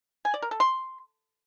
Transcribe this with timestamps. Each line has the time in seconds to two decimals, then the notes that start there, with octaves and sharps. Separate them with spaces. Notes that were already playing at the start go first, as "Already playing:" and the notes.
0.25 G#5
0.34 D5
0.42 A#4
0.51 A4
0.60 C6